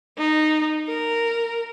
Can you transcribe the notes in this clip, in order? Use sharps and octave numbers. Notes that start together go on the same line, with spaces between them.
D#4
A#4